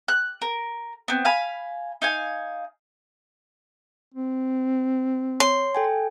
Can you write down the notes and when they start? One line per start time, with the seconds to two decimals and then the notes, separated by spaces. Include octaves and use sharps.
0.08 F#6
0.42 A#4
1.08 B3 C4
1.25 F5 G#5 B5
2.02 D#4 F5 G#5
4.14 C4
5.40 C#5 C6
5.75 A4 G5 G#5